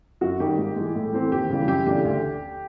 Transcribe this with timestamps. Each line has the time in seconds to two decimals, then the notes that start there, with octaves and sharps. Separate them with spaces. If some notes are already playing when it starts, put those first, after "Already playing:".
0.21 F#2 F#4
0.40 D#3 G3 G4
0.58 G#2
0.76 E3 G#3
0.95 A2
1.13 E3 A3 C4
1.31 D#2 G4
1.49 C#3 E3 G3
1.68 F#2 G4
1.86 C#3 E3 A3 D4 G4
2.05 D2